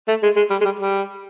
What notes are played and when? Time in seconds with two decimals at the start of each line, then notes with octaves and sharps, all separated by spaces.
0.08 A3
0.23 G#3
0.37 G#3
0.51 G3
0.61 G#3
0.65 G3
0.80 G3